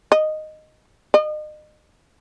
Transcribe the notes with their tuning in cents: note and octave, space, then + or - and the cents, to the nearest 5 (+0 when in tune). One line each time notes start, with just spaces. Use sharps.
D#5 -5
D#5 -35